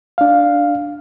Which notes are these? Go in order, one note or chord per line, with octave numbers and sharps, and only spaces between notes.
D4 F5